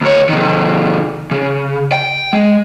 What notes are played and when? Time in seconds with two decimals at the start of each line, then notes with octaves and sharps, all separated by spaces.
0.01 D2 C#5
0.29 C3 D#3
1.31 C#3
1.92 G5
2.33 G#3